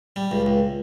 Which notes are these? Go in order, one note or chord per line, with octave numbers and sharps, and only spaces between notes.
G3
C#2
C#2